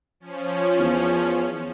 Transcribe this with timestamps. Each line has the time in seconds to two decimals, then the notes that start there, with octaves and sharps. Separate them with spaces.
0.20 F3 C#4
0.79 E2